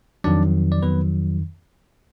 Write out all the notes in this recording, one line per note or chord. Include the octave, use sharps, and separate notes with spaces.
F2 D#3 F#3 D4 D5
D5
F2 D#3 F#3 B3 B4